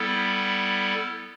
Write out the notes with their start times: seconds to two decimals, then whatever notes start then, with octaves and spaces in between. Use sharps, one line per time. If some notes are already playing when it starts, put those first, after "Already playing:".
Already playing: G3 B3 E4 A4